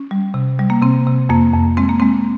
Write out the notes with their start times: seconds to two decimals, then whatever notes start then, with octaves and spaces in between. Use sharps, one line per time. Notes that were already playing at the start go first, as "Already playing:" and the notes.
Already playing: C#4
0.11 G3
0.34 C3
0.59 G3
0.70 A#3
0.82 C3 C4
1.07 C3
1.29 F2 A#3
1.54 F2
1.77 G#3 C4
1.89 A#3
2.00 G#3 C4